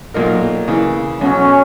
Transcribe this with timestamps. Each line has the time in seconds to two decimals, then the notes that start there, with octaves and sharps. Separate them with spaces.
0.14 B1 A#2 A#3 D#4 A#4
0.68 C#3 E3 A#3
1.21 B1 B2 F#3 C#4